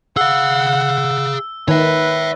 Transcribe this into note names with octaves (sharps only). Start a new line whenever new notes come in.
G#4 F5 F#5 E6
D#3 B4 C#5 E5